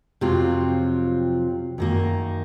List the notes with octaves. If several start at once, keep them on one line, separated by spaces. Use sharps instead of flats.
F2 C3 F#3 C4 F4
F#2 D#3 A#3